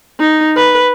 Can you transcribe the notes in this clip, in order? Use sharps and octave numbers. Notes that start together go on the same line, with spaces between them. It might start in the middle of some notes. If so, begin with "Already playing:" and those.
D#4
B4